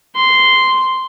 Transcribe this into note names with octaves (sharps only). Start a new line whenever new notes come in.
C6